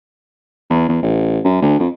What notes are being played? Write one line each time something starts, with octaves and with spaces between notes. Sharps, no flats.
E2
E2
A1
F#2
D2
F2